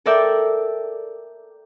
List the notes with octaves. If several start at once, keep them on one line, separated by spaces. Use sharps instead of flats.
A4 A#4 D5 E5 G5